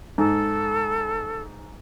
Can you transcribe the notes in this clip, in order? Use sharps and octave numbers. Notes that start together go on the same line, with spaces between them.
G#2 A4